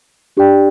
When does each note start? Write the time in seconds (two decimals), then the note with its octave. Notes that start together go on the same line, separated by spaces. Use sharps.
0.37 D4 G4 D5 G5